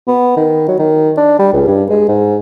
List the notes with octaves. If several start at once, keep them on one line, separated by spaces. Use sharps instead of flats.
B3
D#3
F#3
D#3
D4
G3
C#2
G2
G#3
G#2